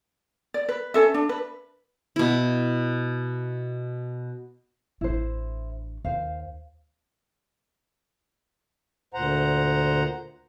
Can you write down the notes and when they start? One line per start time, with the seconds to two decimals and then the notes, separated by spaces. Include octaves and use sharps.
0.54 D5
0.69 B4
0.94 C#4 A4 E5
1.14 D4
1.29 B4
2.16 B2 E4
5.01 A1 D4 E4 C5
6.05 D#2 C5 F5
9.14 D2 A#2 C5 F#5 A#5